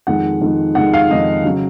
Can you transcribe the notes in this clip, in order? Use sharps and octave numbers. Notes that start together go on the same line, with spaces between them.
F2 D#3 G#3 F#5
F2 D#3 G#3
F2 D#3 G#3 F#5
F5
F2 D#3 G#3 D#5
C#3 F#3